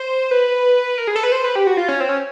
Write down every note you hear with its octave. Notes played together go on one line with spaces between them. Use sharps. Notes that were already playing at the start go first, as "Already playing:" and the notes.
Already playing: C5
B4
A#4
G#4
A4
B4
C5
B4
G4
F#4
F4
C#4
C4
C#4